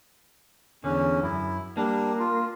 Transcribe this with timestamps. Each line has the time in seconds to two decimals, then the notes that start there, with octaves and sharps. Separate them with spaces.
0.84 E2 D3 C#4
1.23 F#2 E4
1.77 G3 A#3 D4
2.19 F4